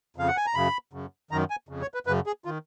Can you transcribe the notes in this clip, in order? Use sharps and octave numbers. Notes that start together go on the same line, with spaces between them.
F2 C#3 F5
F#5
G#5
A#5
F#2 C#3 B5
F#2 C#3
F#2 D#3 A#5
G#5
F2 C#3
C#5
B4
F#2 C#3 B4
G#4
D#3 F4